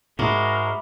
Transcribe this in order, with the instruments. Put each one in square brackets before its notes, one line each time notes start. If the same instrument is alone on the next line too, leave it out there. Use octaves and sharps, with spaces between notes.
[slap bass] G#2 [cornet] G#3 [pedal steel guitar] F#4 A#4 [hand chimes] E5 B5 D6